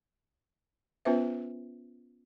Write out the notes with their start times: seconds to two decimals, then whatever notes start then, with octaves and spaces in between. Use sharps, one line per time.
1.05 B3 C#4 F4 B4 C5 E5